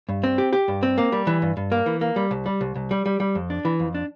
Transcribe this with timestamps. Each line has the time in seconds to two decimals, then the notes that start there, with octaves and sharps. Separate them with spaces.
0.09 G2
0.24 C4
0.38 G4
0.53 G4
0.68 G2
0.83 C4
0.98 A#3
1.12 G3
1.27 E3
1.42 G2
1.57 G2
1.72 A#3
1.86 E3
2.01 A#3
2.16 G3
2.31 C2
2.46 G3
2.61 C2
2.75 C2
2.91 G3
3.06 G3
3.20 G3
3.35 F2
3.50 D4
3.65 E3
3.79 F2
3.95 D4